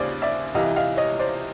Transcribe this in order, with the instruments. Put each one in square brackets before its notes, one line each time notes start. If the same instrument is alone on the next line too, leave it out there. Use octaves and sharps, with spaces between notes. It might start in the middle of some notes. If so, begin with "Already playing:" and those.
Already playing: [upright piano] D#2 C#3 C5 D5
D5 E5
C2 C3 E3 D#5 F5
D#5 F5
C#5 D#5
C5 D5